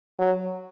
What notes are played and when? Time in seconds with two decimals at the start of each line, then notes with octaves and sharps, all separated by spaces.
0.19 F#3